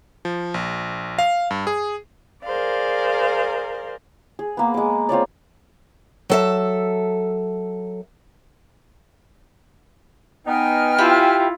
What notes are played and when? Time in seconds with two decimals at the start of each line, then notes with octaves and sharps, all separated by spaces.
0.25 F3
0.54 A#1
1.19 F5
1.51 G2
1.67 G#4
2.44 G#4 A#4 C5 D5 F5
4.39 G#4
4.57 A#3 B3
4.74 G#3 D6
5.09 C4 F4 C#5 D5
6.30 F#3 A4 E5
10.46 B3 D#4 G5 G#5 F6
10.98 E4 F4 G4 E5 B5